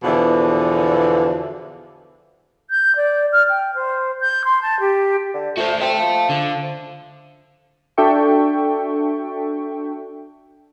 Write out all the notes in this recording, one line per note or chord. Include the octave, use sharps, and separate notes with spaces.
E2 B2 D3 E3 F3
G6
D5
F6
G5
C5
G6
C6
A5
G4
D3
A3 F#4 C5
C4 E5 A5
F3
D3
D4 F#4 A4 E5 G5 C#6